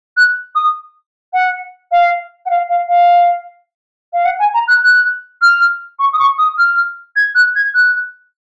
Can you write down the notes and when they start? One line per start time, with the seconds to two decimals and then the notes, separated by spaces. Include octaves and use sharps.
0.17 F#6
0.55 D#6
1.33 F#5
1.91 F5
2.45 F#5
2.50 F5
2.69 F5
2.88 F5
4.13 F5
4.25 F#5
4.39 G#5
4.54 A#5
4.67 F#6
4.83 F#6
5.41 F6
5.99 C#6
6.13 D#6
6.19 C#6
6.38 D#6
6.58 F6
7.16 G#6
7.35 F#6
7.55 G#6
7.74 F#6